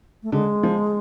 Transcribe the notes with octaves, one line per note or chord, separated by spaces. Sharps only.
A3
D3 G#3
F3